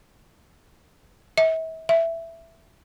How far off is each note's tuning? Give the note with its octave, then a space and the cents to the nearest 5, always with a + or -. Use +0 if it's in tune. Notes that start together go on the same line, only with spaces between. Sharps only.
E5 -40
E5 +10